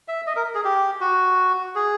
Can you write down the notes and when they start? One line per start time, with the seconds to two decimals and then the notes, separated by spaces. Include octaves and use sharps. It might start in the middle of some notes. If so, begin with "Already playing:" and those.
0.08 E5
0.27 D#5
0.36 A#4
0.55 G#4
0.65 G4
1.01 F#4
1.76 G#4